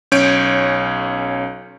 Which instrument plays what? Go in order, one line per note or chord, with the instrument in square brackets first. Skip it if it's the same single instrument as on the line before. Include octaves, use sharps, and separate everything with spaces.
[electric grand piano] B1 C#4 C#5 G6 D7